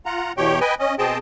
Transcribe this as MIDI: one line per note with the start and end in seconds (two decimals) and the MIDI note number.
0.06 0.32 65
0.06 0.32 78
0.06 0.32 82
0.37 0.60 40
0.37 0.60 47
0.37 0.60 67
0.37 0.60 73
0.37 0.60 79
0.61 0.75 71
0.61 0.75 75
0.61 0.75 79
0.61 0.75 80
0.79 0.95 61
0.79 0.95 75
0.99 1.18 47
0.99 1.18 60
0.99 1.18 68
0.99 1.18 75
0.99 1.18 79
0.99 1.18 81